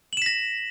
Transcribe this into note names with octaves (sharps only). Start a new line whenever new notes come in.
A#6 B6 E7 F#7